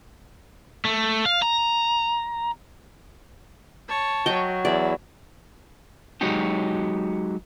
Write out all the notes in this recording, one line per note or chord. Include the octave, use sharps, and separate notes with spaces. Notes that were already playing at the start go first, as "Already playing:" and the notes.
A3
F5
A#5
C#5 A5
F#3 D#5 G5
E2 E4 D5
F#3 G#3 D#4 F#4 G4